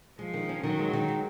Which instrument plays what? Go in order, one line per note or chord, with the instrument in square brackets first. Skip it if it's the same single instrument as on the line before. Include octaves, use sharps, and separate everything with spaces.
[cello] F3 [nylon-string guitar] G#3
[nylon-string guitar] D#3
C#4
[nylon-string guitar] D#3 [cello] F#3
[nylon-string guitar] G#3
D#3
G#3